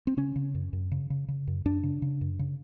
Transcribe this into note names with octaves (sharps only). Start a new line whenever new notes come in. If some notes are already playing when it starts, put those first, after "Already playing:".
C4
C#3 C#4
C#3
F#2
F#2
C#3
C#3
C#3
F#2
F#2 D4
C#3
C#3
F#2
C#3